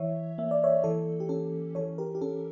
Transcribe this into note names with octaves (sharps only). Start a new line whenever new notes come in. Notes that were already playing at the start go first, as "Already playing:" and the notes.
Already playing: E3 C#5 E5
A#3 E5
D5
C#5 E5
E3 A4
G4
C#4 A4
E3 A4 C#5
G4 A#4
G4
C#4 A4